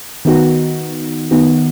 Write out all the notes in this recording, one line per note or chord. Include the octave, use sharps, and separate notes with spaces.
D#3 B3 D#4 F#4
D#3 B3 D#4 F#4